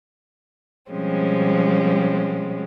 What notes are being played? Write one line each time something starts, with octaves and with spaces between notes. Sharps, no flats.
B2 F3 G3 G#3 C4 C#4